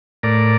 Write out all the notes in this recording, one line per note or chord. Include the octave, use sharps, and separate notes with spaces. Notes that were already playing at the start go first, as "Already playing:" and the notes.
A2 A#4 D5